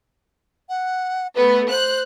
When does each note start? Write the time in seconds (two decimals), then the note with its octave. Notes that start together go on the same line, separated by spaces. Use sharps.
0.69 F#5
1.35 A3 B3 B4
1.70 C5 F#6